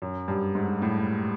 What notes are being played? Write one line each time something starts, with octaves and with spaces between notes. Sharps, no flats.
F#2
G2
G#2
A2